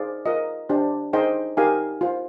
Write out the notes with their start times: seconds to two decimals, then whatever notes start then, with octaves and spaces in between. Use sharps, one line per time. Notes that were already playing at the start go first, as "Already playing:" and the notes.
Already playing: D#4 G#4 C5 D5 F5
0.26 F4 A#4 D#5
0.69 D4 G4 C5
1.13 D#4 G#4 C5 D#5 G5
1.57 D#4 G4 A#4 F5 G#5
2.01 F4 C5